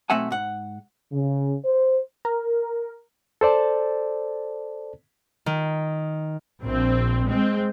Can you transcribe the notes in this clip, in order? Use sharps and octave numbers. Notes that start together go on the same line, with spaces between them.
B1 A3 C4 E5 F#5 G#5
G#2 F#5
C#3
C5
A#4
A4 C5 D5 A5
D#3
A#1 C4
G#3 C4